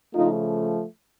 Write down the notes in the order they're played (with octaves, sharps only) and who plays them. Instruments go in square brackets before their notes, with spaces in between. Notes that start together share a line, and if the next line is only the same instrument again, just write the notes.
[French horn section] C#3 F3 A3 D#4 F4